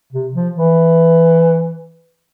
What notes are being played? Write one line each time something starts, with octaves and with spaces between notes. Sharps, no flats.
C3
F3
E3